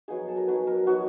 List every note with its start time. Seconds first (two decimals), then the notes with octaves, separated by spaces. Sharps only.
0.08 F#3 B3 D#4 G#4
0.28 A4
0.37 A#4
0.47 F#3 B3 D#4 B4
0.67 A#4
0.87 F#3 B3 D#4 F#4